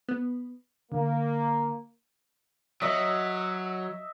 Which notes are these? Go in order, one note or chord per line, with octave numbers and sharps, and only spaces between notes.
B3
D3 A#3
F#3 D#5 E5